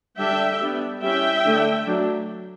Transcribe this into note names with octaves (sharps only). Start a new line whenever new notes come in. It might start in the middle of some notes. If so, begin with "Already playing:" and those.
D3 G3 D4 E5 G5
G3 B3 D4
G3 C#4 E4 E5 G5
D3 A3 D4
F#3 A3 D4